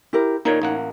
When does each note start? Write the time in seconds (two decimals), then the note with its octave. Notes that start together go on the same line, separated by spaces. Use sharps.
0.13 E4 G4 A#4
0.45 A#2 D#3 A#3 D#4 C#5
0.62 A1 A#3 F#5